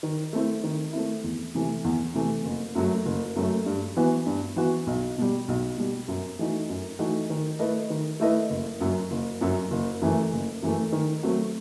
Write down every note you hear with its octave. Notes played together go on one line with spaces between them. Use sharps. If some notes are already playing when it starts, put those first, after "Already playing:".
D#3
A3 C4 E4
D#3
A3 C4 E4
E2
C3 E3 A3
E2
C3 E3 A3
F#1
F#2 F#3 A3
F#1
F#2 F#3 A3
G2
E3 B3 F#4
G2
E3 B3 F#4
B1
B2 G3
B1
B2 G3
F#2
E3 A3 D#4 F#4
F#2
E3 A3 D#4 F#4
D#3
A3 E4 B4 D#5
D#3
A3 E4 B4 D#5
F#1
F#2 F#3
F#1
F#2 F#3
F#1
F#2 E3 A3
F#1
F#2 E3 A3
D#3
F#3 A3 C4 F#4